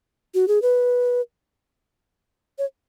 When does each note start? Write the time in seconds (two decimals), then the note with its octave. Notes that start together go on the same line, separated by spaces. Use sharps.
0.34 F#4
0.48 G#4
0.62 B4
2.59 C#5